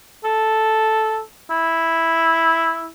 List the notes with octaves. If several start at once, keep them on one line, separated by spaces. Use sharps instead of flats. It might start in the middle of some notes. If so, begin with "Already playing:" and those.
A4
E4